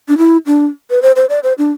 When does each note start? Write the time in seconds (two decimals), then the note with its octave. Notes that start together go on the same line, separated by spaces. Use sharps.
0.08 D4
0.18 E4
0.46 D4
0.90 B4
1.02 C5
1.16 C5
1.30 D5
1.43 C5
1.58 D4